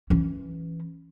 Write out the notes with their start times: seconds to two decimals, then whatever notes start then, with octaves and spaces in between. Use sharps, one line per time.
0.10 E3 C#4